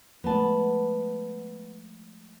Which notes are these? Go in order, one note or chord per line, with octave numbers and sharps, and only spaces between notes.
F3 G#3 A3 B3 A5